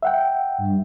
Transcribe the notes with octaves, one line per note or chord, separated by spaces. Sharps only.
E5 F#5 G5
G2